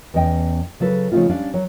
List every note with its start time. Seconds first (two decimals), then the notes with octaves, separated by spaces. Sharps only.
0.14 E2 C#4 D#5 G5
0.80 C#3 F#3 A4 B4
1.12 C#3 F3 A3 C4 D#4 F4
1.29 G3 C#4 D4 F5
1.54 F#3